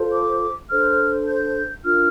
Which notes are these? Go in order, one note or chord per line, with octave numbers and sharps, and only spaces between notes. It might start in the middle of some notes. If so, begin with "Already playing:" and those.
Already playing: F4 A4 C5
D6
D4 A4 C5 F6
G6
D4 F4 A#4 F6